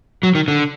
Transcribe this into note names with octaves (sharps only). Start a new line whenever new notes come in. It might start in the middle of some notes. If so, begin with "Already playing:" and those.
F#3
D#3
D3